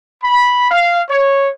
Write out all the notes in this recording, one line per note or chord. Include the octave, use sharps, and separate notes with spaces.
B5
F5
C#5